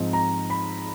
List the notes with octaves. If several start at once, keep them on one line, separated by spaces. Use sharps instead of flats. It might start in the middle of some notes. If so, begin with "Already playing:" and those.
Already playing: G#2 F3 G#3 C4 D#4
A#5
B5